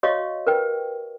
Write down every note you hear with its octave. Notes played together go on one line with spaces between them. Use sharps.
F#4 C#5 D#5 F5 C#6
A#4 B4 G5